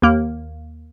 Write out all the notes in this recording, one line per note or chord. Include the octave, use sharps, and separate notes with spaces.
D#2 A#3